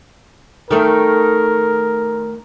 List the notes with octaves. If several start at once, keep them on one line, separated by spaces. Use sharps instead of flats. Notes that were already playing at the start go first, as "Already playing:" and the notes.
D#3 A3 A#4